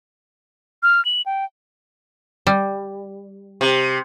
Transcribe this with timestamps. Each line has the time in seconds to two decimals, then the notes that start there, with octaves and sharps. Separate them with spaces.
0.83 F6
1.05 F#7
1.26 G5
2.47 G3
3.61 C3